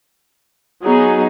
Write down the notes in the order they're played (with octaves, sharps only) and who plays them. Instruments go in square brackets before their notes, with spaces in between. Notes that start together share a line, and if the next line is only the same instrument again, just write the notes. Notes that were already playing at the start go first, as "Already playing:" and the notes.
[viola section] F#3 B3 D#4 G#4